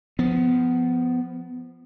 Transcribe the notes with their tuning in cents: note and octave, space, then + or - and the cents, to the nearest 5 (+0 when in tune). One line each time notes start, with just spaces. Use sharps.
F3 +0 B3 +15